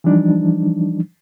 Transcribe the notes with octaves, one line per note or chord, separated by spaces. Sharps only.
E3 F3 G3 D4 D#4